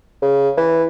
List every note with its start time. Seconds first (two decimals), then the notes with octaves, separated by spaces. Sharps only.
0.22 C#3
0.58 E3